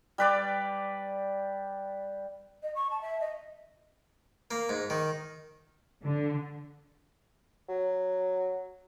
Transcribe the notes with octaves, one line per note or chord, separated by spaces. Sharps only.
G3 B4 D5
D#5
C#6
A5
E5
D#5
A#3
G#2
D#3
D3
F#3